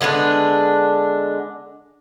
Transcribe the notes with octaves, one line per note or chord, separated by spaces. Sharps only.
D3 G#3 B3 D4